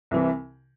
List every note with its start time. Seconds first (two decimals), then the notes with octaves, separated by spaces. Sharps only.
0.11 C2 C3 E3